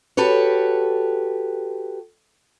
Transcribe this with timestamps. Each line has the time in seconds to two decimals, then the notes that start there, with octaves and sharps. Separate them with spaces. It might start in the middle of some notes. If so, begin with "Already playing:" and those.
0.17 F#4 G4 A4 B4 C#5